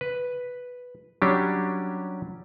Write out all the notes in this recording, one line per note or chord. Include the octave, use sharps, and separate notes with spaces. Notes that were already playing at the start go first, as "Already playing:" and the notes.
B4
F#3 G3 C#4 D4 G4